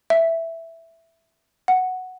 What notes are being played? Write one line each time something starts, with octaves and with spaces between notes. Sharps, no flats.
E5
F#5